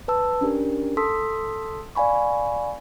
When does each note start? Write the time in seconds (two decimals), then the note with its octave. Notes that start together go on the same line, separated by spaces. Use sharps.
0.08 B4 A5 E6
0.41 C#4 D4 G4 A#4
0.97 A4 A5 C6 D#6 E6 B6
1.95 D5 F5 G#5 B5 C#6